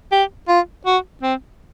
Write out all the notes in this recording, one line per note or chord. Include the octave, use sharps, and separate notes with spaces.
G4
F4
F#4
C4